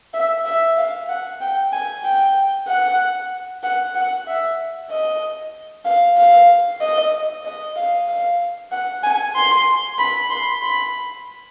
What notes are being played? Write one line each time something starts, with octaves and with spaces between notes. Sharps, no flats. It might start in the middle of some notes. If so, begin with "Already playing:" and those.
E5
E5
F5
F#5
G5
G#5
G5
F#5
F#5
F#5
E5
D#5
F5
F5
D#5
D#5
F5
F5
F#5
G#5
C6
B5
C6
B5